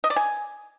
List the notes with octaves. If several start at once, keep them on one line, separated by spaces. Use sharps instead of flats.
D#5
D5
G#5